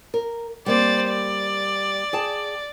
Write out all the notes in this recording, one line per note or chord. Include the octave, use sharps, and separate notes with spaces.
A#4
G3 A#3 C4 C5 D5
D5
G#4 G5 A5